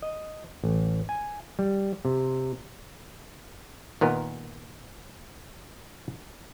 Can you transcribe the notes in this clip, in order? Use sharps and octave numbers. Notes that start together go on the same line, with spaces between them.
D#5
A1
G#5
G3
C3
A#2 D#3 B3 A#4